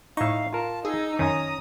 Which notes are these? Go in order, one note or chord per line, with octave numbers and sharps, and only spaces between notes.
A2 D#4 E5 F5 C#6
F4 A#4 A5
D#4 G#4 D#5 E6
F#2 D#3 C#4 G#5 A#5 D#6